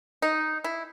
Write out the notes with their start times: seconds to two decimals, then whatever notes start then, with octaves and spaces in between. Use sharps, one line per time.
0.22 D#4
0.64 E4